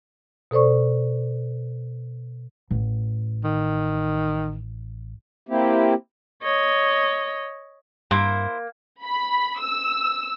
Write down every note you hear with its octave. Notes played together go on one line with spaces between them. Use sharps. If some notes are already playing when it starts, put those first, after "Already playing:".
B2 A4 C5 D5 C#6
A1
D#3
A#3 C4 E4 G4
C#5 D#5
G2 A#3 E4 C5
B5
E6